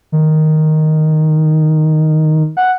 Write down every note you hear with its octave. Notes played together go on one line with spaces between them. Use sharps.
D#3
F#5